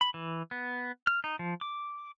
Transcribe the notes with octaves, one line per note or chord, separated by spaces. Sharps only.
B5
E3
B3
F6
D#4
F3
D6